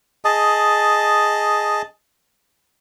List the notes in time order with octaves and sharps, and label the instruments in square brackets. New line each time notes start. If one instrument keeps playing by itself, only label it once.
[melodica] G#4 D#5 A5